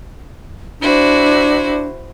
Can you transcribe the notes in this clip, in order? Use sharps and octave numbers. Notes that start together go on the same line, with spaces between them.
D4 E4 F#4 C5